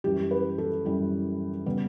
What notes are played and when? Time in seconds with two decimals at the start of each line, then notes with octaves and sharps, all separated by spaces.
0.04 F#2 E3 G3 G4
0.31 B4
0.58 A4
0.85 F#2 E3 G3
1.66 C#3 G3 B3